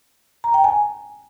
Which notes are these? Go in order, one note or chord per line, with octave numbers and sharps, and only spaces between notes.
A#5
G5
G#5